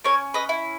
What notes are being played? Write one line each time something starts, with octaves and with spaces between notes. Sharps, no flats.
C#4 A#4 C#5
B4 D#5
E4